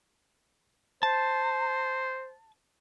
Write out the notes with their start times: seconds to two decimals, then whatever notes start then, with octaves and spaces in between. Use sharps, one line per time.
1.03 C5 A5